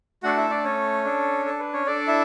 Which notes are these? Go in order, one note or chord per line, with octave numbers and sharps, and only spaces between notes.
A3 D4 F#4 A4 F#5
E4 E5
D4 D5
C#4 C#5
D4 A4
A4
B4
C#4 C#5
D4 A4 D5
E4 E5